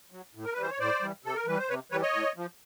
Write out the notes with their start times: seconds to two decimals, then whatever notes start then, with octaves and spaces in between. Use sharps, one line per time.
0.12 F#3
0.35 A2
0.45 A#4
0.53 B4
0.57 E3 G3 C5
0.70 C#5
0.80 A2 C5 D5
1.02 E3 G3
1.24 C3 A4
1.36 A#4
1.46 E3 G3 B4
1.58 C5
1.69 C3 B4 C#5
1.92 E3 G3 B4 C#5
2.02 C#5 D#5
2.14 A2
2.36 F3